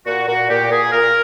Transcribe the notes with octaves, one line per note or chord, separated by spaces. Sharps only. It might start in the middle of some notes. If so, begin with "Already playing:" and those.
A#2 F#4
A#2 F#4
A#2 G4
A#2 G#4
A#2 A#4